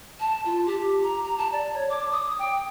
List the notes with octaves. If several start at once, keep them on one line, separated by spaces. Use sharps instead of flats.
A5
F4
G4
A#5
A#5
A5
D5
C#5
D6
D#6
G5